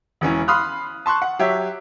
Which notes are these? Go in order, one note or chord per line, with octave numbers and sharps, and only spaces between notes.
E1 E3 C#4
F5 B5 C6 D#6 F6 F#6
A5 C6 C#6 F#6
F#5
F#3 G4 C#5 E5